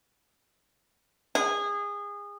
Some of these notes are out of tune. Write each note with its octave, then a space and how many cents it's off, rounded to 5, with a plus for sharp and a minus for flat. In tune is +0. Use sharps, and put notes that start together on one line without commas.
G#4 -25